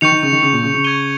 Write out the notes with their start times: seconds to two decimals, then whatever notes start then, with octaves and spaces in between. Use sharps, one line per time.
0.01 D#3 C#6 G6 C#7 F7
0.12 D#3
0.23 C#3
0.32 D#3
0.43 C#3
0.53 A#2
0.63 C#3
0.74 C#3
0.84 C#6 G#6 D#7 G7